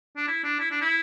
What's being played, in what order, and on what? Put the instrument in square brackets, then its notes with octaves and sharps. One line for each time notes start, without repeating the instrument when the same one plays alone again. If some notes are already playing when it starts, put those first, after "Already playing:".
[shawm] D4
E4
D4
E4
D4
E4